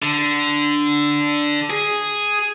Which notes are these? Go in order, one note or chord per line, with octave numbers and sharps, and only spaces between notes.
D3
G#4